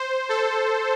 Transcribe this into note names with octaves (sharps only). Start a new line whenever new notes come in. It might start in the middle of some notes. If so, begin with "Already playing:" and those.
Already playing: C5
A4